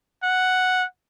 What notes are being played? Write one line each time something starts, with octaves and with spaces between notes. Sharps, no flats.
F#5